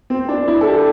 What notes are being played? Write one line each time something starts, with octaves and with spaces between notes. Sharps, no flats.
C4
D4
E4
A4
G4